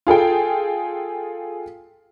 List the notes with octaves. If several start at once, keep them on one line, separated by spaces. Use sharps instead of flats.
F4 G#4 A4 G5